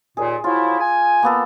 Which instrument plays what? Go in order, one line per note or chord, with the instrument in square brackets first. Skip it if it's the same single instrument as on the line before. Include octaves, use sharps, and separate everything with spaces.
[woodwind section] D#2 A#2 [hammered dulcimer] G#4
[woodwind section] F3 F#3 E4 [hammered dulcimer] F4
[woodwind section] G#5
[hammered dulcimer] A#3 B3 A4